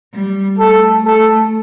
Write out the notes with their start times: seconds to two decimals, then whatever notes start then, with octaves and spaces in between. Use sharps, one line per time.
0.12 G3
0.59 A3 A4
1.05 A4